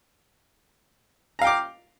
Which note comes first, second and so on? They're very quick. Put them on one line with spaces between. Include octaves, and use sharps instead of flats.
A#5 F5 G5 D6